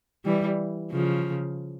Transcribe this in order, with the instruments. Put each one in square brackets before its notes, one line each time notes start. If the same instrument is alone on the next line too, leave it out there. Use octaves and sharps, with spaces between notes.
[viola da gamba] E3 G3
C#3 F3